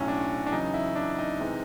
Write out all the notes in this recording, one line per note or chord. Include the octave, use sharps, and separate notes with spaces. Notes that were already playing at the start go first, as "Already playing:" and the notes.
Already playing: B1 A2 F#3 C#4
D4
D4
E2 C#3 F#3 D#4
E4
D4
D#4
C3 E3 G#3